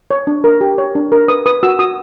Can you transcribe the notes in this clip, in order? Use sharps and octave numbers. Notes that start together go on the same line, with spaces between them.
C#5
D4
A#4
G4
C#5
D4
A#4
B4 D#6
B4 D#6
F#4 E6
F#4 D#6